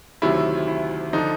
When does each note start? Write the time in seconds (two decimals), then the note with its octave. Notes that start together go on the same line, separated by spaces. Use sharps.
0.22 D2 C3 D#3 F#3 E4
0.68 E4
1.13 D3 F3 D#4